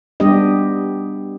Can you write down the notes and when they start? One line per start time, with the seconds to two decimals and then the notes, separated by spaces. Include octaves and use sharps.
0.20 G3 B3 D4 G4 D#5